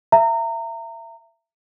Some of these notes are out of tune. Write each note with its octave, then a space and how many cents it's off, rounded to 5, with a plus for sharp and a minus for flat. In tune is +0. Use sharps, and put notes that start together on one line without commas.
E5 +25 A#5 -25